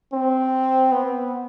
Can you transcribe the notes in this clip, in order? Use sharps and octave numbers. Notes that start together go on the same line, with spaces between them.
C4
B3